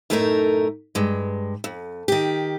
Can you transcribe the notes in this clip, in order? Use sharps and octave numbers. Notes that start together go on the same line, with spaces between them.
F#2 A2 A3 D#4 A4 A#4
G2 G#3
F2
D#3 G4